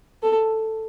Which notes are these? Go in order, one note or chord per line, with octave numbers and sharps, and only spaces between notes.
A4